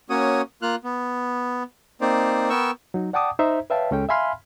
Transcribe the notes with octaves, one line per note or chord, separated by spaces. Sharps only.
A#3 C#4 F#4 C#5 D#6
A#3 F4 F6 F#6
B3
A#3 C4 D#4 C5 D5
B3 A#4 G5 C#6 E6
F#3 D#4
D5 F#5 G5 A5 D6 D#6
D#4 C5 E5 A#5
B4 C#5 E5 F5 G5 A5
C#2 G#3 C#4 A4 G5
E5 F5 G#5 B5 C6 F6